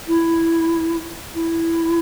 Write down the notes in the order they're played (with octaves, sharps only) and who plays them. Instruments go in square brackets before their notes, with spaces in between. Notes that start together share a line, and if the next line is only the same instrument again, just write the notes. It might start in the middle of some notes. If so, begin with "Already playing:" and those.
[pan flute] E4
E4